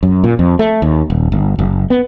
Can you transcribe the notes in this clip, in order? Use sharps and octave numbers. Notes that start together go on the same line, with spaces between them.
F#2
A#2
F2
A3
D#2
D#1
G1
F#1
B3